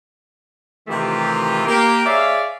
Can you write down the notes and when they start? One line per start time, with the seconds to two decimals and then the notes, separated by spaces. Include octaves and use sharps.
0.88 C3 D#3 E3 A3 F4 G4
1.66 A#3 G4
2.06 G#4 C#5 D5 E5 F5